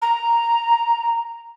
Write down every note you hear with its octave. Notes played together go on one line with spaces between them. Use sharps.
A#5